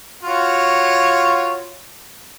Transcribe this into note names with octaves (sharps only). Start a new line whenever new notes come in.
F4 F#4 C#5